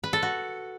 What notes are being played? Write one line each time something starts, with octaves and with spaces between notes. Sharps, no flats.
B4
A4
F#4